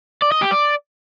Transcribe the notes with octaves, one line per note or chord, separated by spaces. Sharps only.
D5
D#5
G4
D5